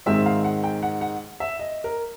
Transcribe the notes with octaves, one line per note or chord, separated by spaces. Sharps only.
G#2 D#3 G#3 C4 E5
F5
F#5
G5
F#5
F#5
E5
D#5
A#4